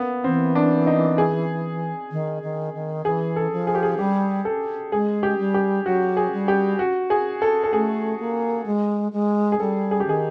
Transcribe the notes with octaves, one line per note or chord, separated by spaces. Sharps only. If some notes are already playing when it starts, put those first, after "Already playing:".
Already playing: A#3 B3
E3 C4
D4
D#4
G#4
D#3
D#3
D#3
E3 G#4
A4
F3
G#4
G4
G#4
G3 G4
A4
G#3 G#4
G4
G3
G4
F#3 F#4
G#4
G3
G4
F#4
G#4
A4
A4
A3 G#4
A#3
G#3
G#3
G#4
G3 A4
G#4
G4
D#3 G#4